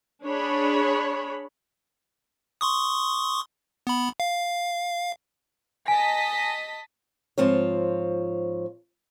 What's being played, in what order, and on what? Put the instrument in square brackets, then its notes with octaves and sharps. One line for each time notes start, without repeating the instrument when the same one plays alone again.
[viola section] D4 G#4 C#5 B5
[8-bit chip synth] C6 C#6 D#6
B3 B5
F5
[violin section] D#5 A5 B6 [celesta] G#5
[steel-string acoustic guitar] G#2 F3 C4 F4 C#5